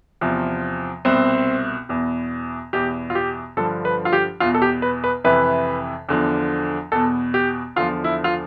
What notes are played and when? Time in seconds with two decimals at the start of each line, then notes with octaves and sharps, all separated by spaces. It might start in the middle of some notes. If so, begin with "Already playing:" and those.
0.21 E2 C3 F3
1.05 C2 B2 C4
1.89 E2 B2
2.73 E2 B2 G4
3.10 F4
3.15 G4
3.57 G2 D3 F3 A4
3.85 B4
4.05 F4
4.13 G4
4.40 E2 B2 F4
4.54 A4
4.62 G4
4.82 B4
5.04 B4
5.24 F2 C3 E3 B4
6.09 E2 D3 F3
6.92 E2 B2 A4
7.34 G4
7.76 E2 D3 F3 F4
8.04 E4
8.24 F4